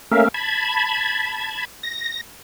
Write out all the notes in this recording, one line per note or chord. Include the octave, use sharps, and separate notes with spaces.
A3 A#3 C#4 A#4 E5 F5
A5 B5 G#6
A#6